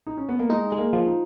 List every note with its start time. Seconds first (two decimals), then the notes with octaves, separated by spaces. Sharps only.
0.07 D#4
0.17 C#4
0.29 B3
0.39 A#3
0.50 G#3 D#4
0.72 G#3
0.78 A#3
0.93 F3
1.07 D#4